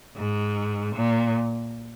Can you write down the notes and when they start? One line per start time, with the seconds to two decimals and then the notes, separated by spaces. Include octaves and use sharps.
0.17 G#2
0.95 A#2